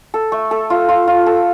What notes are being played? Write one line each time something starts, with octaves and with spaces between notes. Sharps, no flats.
A4
A3
A4
F4
F4
F4
A4